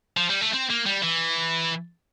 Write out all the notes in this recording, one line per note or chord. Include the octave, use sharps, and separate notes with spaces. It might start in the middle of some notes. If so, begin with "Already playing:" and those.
F3
G3
A3
C4
A#3
G3
E3